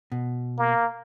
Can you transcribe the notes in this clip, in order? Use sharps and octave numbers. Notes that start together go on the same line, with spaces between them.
B2
A#3